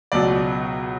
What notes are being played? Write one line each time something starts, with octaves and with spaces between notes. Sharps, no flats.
C#2 B2 F#3 D5